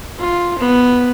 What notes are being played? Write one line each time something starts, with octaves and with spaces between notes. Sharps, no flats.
F4
B3